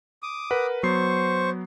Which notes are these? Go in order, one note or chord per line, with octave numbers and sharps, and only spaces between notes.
D6 D#6
A#4 B4 F#5
F#3 B3 C5 C#6 C7